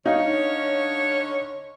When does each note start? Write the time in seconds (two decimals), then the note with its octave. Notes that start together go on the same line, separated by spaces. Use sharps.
0.06 D3 C#4 D#4 C#5 F5